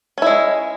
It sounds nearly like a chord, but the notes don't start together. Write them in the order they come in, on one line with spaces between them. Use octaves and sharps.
C#4 E4 G#3